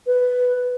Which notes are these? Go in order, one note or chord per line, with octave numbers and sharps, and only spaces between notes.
B4